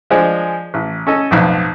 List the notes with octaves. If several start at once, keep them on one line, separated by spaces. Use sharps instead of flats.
F3 G#3 D4
A1
C#4 A4 D#5
B1 F2 A2